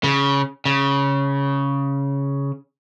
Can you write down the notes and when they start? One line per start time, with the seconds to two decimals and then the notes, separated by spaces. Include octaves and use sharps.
0.04 C#3
0.65 C#3